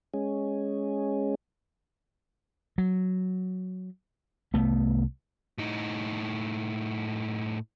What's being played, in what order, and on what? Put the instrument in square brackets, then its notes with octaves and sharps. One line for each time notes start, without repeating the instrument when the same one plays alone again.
[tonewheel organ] G#3 C#4
[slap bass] F#3
C2 A3 B3
[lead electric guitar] A2 D#4